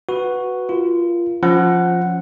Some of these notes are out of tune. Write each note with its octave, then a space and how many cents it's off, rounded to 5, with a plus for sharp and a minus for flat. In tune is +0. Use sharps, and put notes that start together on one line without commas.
F#4 +0 B4 +0
F4 -20 A#4 +35
F3 +5 C#4 +0 F#5 +0